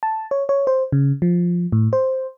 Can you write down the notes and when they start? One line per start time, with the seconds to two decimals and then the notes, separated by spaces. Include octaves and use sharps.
0.03 A5
0.31 C#5
0.49 C#5
0.67 C5
0.92 C#3
1.22 F3
1.72 A2
1.93 C5